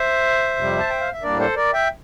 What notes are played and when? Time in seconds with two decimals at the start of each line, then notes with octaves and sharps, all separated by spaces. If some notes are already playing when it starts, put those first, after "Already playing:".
Already playing: C5 E5
0.56 F2 C3 G3
0.79 A5
0.89 G5
1.00 F5
1.12 E5
1.22 A2 G3 A#3 D4 A#4 D5
1.39 A4 C5
1.56 A#4 D5
1.73 E5 G5